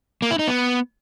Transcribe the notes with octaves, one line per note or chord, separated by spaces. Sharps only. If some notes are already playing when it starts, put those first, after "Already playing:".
A#3
E4
D#4
B3